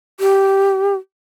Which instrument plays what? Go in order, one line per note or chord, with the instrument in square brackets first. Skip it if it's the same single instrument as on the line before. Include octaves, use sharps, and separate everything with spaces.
[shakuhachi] G4